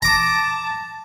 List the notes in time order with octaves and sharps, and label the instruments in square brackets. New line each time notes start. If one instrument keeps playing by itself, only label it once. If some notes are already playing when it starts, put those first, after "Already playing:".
[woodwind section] A5 [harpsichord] A#5 D6